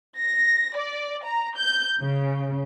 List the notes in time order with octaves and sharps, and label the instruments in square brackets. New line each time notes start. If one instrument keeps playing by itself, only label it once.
[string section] A#6
D5
A#5
G6
C#3